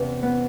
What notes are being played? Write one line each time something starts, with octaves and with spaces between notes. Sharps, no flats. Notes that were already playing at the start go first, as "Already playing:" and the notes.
Already playing: E2 C3 E3 C#4
B3